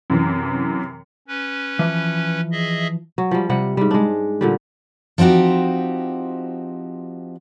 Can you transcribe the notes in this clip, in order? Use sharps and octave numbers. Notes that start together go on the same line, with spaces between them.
F#2 C3 E3
C#4 B4
E3 F3
G#4 D#5 E5
F#3
F3 G3
C3 G3 F#5
G#2 G3
G#3 D4
A#2 D3 G3
F3 C4 D#4 F#4 G4